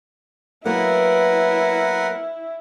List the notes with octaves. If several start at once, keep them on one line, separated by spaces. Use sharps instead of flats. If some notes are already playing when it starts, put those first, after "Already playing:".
F#3 A#3 B3 E4 A#4 B4 F#5